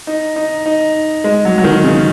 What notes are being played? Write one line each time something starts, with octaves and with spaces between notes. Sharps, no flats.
D#4
D#4
D#4
G#3
F#3
F#3
D#3
C#3